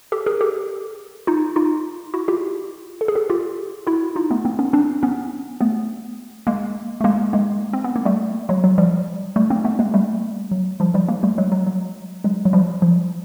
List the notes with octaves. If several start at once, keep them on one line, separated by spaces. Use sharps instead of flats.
G4 A4
G#4 A#4
G4 A4
D#4 F4
D#4 F4
E4 F#4
F4 G4
A4
G#4
G4 A4
F4 G4
E4 F#4
D#4 F4
A3 B3
A#3 C4
B3 C#4
C4 D4
B3 C#4
A3 B3
G#3 A#3
A3
G#3 A#3
G#3 A#3
C4
B3
A#3
G3 A3
F#3 G#3
F#3
F3 G3
G3 A3
A#3 C4
A3 B3
G#3 A#3
G3 A3
F#3
F3 G3
F3 G3
G#3 A#3
G3 A3
F#3 G#3
F#3
F#3
F#3 G#3
F#3
F3 G3
F3